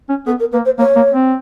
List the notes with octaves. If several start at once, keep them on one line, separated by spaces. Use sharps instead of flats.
C#4
B3 A4
A#4
A#3 B4
C5
A#3 C#5
A#3
C4